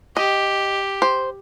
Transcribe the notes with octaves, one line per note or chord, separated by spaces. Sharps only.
G4 D#5
C5